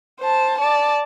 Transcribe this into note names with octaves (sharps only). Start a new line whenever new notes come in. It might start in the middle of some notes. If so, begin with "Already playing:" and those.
C5 A5
D5 A5